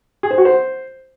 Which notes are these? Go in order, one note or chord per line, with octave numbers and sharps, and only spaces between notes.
G#4
C5
F#4
C5